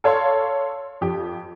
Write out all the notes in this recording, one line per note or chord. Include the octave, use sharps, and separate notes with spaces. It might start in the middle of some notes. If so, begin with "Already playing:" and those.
A4 C#5 F5 C6
F2 G4